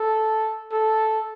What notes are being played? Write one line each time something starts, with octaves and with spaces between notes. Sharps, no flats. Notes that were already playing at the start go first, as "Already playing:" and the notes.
Already playing: A4
A4